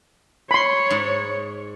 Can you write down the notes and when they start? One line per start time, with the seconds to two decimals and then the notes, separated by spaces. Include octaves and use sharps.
0.51 C#5 B5 C6
0.90 G#2